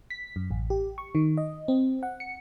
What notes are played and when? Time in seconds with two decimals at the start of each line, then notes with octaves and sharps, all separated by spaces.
0.10 B6
0.36 F#2
0.51 A1
0.70 G4
0.98 C#6
1.15 D#3
1.37 D#5
1.68 C4
2.03 F#5
2.20 C#7